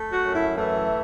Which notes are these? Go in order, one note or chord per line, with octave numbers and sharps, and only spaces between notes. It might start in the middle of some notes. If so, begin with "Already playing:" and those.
Already playing: A3
F#4
F#2
E4
E3 A3